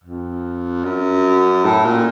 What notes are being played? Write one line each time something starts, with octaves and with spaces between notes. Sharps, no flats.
F2
F#2
A2
A#2